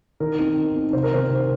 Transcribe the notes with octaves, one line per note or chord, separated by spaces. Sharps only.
D#3 A#4
C4 D#4
D#3
C4 D#4
C3 C5
A#4
D#3 C4 C5
C3